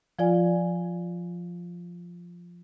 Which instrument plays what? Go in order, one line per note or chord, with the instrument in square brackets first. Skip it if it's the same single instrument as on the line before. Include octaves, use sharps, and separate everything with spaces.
[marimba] F3 F4 D5 G#5